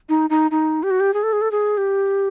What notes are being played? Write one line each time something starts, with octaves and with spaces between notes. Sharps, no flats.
D#4
D#4
D#4
G4
F#4
G4
G#4
A4
G#4
A4
G#4
G4